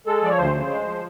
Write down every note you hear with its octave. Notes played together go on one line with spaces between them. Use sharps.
G#3 A4
F3 D5
C#5
D2 C5
C#3
G#3
F3